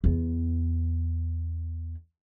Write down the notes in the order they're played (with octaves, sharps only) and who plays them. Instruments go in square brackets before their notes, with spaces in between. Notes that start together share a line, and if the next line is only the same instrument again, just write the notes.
[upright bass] E2 B3